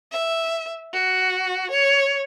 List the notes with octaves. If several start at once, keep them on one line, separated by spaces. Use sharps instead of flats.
E5
F#4
C#5